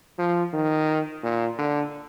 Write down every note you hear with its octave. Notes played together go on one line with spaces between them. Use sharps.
F3
D#3
A#2
D3